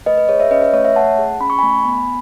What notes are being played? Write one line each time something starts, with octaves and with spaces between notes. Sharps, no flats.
A3 B4 D#5
B4
G#4 C#5
C#5 E5
C#4 B4 D#5
B4
A3 C#5
C#5 E5
A3 F#5 A5
G#4
C#4 B5
C#6
A3 G#5 B5
B3